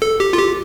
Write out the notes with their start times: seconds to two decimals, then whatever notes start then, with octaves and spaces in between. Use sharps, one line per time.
0.02 A4
0.20 G4
0.33 F4
0.38 G4